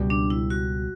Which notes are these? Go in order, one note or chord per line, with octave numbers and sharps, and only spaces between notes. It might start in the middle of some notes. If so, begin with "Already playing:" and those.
Already playing: C#2 B2 G3
D4
E4
F#4